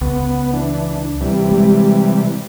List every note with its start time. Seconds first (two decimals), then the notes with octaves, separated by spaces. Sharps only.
0.01 C#2 B3
0.53 E3 D4
1.21 C3 E3 G3
1.51 G#3